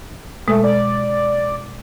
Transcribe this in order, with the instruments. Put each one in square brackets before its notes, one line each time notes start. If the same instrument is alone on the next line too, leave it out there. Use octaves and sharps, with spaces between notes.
[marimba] B2 G#3 [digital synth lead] A3
[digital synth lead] D5